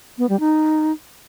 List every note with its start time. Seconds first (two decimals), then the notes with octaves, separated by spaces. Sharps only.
0.18 B3
0.29 G3
0.40 D#4